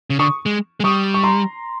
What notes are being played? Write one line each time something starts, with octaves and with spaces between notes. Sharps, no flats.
C#3
D3 C#6 D#6
G#3
G#3
G3 C#6 D#6
C#6
A#5 C6